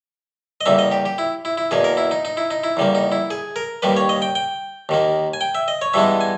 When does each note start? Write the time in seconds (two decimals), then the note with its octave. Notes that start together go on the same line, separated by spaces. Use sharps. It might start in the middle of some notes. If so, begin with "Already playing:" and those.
0.61 D#5
0.66 E2 C#3 G3 A#3 E5
0.79 D#5
0.91 G4
1.05 G4
1.18 E4
1.45 E4
1.58 E4
1.71 E2 B2 A#3 G#4
1.84 A#4
1.97 E4
2.11 D#4
2.25 D#4
2.37 E4
2.51 D#4
2.64 E4
2.77 E2 C#3 G3 A#3
2.95 D#4
3.12 E4
3.30 G#4
3.56 A#4
3.82 D#2 D#3 G3 A#3 B4
3.97 C#5
4.09 D#5
4.22 G5
4.35 G5
4.89 D#2 D#3 A#3
5.34 G#5
5.41 G5
5.55 E5
5.68 D#5
5.82 C#5
5.94 G2 E3 G#3 B3 E5
6.21 G#5